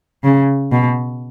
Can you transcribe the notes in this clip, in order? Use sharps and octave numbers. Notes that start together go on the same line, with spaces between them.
C#3
B2